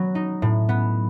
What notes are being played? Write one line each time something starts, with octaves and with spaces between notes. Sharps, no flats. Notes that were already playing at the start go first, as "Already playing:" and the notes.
Already playing: F#3 B3
D#4
A2
B3